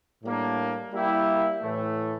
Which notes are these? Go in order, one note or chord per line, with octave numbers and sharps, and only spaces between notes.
A2 G3 A#3 D4
G3 A#3 E4 G4
A2 E3 A3